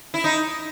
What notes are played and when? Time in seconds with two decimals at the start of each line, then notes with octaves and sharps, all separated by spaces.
0.14 E4
0.24 D#4